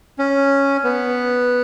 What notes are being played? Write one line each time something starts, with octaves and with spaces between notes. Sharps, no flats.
C#4
B3